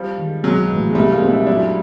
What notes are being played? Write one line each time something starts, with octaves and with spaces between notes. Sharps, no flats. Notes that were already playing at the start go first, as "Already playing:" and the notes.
Already playing: F3 G3
D#3 G#3
B1 F#3 G#3
A2 E3
G#3
C2 G3 A3
G#3 A#3
A#2 G3 C4 D#4
D4 E4
F#2 D4 E4